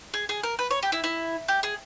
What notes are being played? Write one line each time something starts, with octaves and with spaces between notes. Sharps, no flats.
G#4
G#4
A#4
B4
C#5
G4
E4
E4
G4
G#4